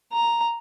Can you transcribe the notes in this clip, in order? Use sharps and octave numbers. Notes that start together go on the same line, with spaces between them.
A#5